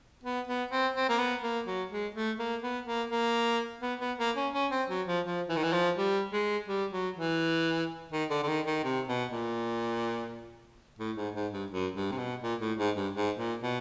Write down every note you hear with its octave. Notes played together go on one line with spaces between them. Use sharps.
B3
B3
C4
C4
A#3
B3
A#3
F#3
G#3
A3
A#3
B3
A#3
A#3
B3
B3
A#3
C#4
C#4
C4
F#3
F3
F3
E3
D#3
E3
F3
G3
G#3
G3
F#3
E3
D#3
D3
D3
D#3
D#3
C3
B2
A#2
A2
G#2
G#2
G2
F#2
G2
C3
B2
A#2
A2
G#2
G2
G#2
A#2
B2